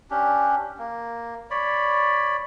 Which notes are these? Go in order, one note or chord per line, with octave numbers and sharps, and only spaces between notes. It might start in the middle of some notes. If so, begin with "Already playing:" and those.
C#4 D4 G4
A#3
C#5 D5 B5